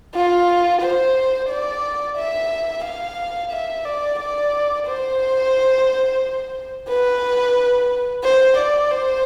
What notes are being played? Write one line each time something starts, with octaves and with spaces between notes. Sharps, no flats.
F4
C5
D5
E5
F5
E5
D5
D5
C5
B4
C5
D5
C5